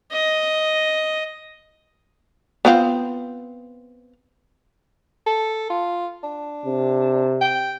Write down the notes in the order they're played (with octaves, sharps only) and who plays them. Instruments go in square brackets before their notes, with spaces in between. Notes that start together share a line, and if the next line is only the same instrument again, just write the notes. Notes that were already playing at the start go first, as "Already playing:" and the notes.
[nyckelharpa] D#5
[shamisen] B3 C4 F4
[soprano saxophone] A4
F4
D4
[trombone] C3
[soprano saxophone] G5